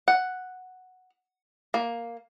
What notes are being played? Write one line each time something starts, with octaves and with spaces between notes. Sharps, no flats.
F#5
A#3